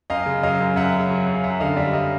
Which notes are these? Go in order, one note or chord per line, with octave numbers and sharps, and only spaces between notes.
F#2 D#5 F5
C#3
F#3 D#5 F5
F#2
F#2 E5 F#5
C#3
F#3
F#2
F5
F#2 E5 F#5
D3 D#5 F5
G3 D5 E5
F#2 D#5 F5